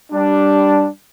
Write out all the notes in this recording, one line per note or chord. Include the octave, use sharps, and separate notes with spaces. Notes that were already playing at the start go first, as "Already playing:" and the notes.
G3 D4